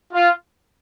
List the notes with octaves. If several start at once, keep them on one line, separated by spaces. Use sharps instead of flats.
F4